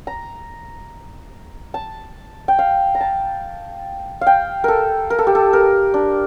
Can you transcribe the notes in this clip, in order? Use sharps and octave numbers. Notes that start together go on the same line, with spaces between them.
A#5
A5
G5
F5
A#5
A5
F5
G5
A4 A#4
A#4
A4
G4
A4
A#4
D4